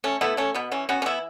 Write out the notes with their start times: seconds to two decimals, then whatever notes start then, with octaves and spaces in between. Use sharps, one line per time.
0.04 A3 C#4
0.21 A3 B3 E4
0.37 A3 C#4
0.54 B2 B3
0.72 E3 C#4
0.89 B3 C#4 F#4
1.02 C#4
1.06 E3 B3 E4